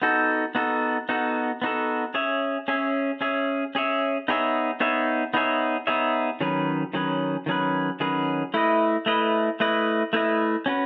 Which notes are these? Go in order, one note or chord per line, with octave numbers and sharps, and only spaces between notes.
B3 D#4 F#4 A4
B3 D#4 F#4 A4
B3 D#4 F#4 A4
B3 D#4 F#4 A4
C#4 G#4 C#5 E5
C#4 G#4 C#5 E5
C#4 G#4 C#5 E5
C#4 G#4 C#5 E5
B3 D#4 G#4 C#5 E5
B3 D#4 G#4 C#5 E5
B3 D#4 G#4 C#5 E5
B3 D#4 G#4 C#5 E5
D#3 F#3 C#4 G#4 B4
D#3 F#3 C#4 G#4 B4
D#3 F#3 C#4 G#4 B4
D#3 F#3 C#4 G#4 B4
A3 E4 B4 D#5
A3 E4 B4 D#5
A3 E4 B4 D#5
A3 E4 B4 D#5
C#4 F#4 B4